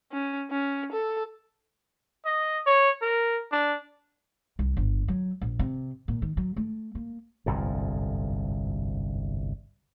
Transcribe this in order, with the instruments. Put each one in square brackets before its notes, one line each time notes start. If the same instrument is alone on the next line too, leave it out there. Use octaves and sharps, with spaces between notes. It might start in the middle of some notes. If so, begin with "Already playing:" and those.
[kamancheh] C#4
C#4
A4
[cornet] D#5
C#5
A#4
D4
[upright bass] C2
G1
F#3
A#1
C3
A#2
D#3
F#3
A3
A#3
[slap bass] G1 C2 F2 G#2